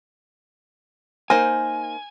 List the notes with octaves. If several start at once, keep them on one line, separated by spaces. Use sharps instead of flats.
A#3 D#4 C5 G#5